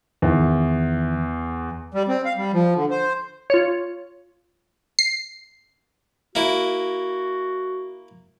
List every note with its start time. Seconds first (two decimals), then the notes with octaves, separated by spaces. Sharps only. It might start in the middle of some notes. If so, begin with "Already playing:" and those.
0.22 E2 D#3 E3
1.94 G3
2.08 C4
2.25 F5
2.37 G3
2.53 F3
2.76 D3
2.91 C5
3.50 F4 C#5
4.99 C7
6.35 A#3 E4 F#4